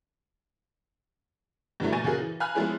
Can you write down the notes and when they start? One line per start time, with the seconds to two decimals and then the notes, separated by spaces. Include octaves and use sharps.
1.80 G2 D3 E3 F#3 A3
1.92 A#2 G#5 C#6 A6 A#6 D#7
2.04 C#3 F#4 G#4 A#4
2.19 E3
2.40 F5 G#5 A#5 B5 F6 F#6
2.55 F3 G#3 B3 C#4 E4 G#4